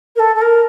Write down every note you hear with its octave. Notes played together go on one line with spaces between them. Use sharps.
A#4
A4
A4
A#4